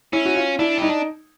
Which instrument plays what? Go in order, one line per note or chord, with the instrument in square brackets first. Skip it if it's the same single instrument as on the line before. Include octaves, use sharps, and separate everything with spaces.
[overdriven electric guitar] C#4 [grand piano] E4
[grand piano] F#4
F4
[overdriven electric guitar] D4 [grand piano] E4
[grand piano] D#4 [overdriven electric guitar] G4